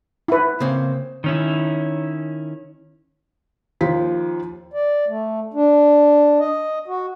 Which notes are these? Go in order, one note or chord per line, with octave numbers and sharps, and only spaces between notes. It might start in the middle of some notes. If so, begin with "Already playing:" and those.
E4 B4
C#3 A#3 C4
D#3 C#4 E4
D#2 F3 F4 B6
D5
A3
D4
D#5
F#4